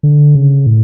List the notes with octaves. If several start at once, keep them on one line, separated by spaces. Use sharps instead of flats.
D3
C#3
A2